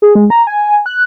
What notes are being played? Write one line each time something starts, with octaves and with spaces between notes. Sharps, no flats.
G#4
G#3
A#5
G#5
F#6